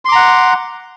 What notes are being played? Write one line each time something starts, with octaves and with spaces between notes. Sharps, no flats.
F#5 A#5 C6 D6